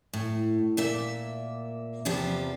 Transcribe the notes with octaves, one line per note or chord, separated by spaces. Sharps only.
A2
A#2 A#3 E5
E2 C3 F3 B3 G4 C5